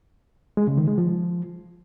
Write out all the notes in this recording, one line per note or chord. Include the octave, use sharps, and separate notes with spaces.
G#3
C#3
D#3
G#3
F3